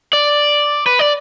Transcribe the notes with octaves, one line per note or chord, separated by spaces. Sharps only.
D5
B4
D5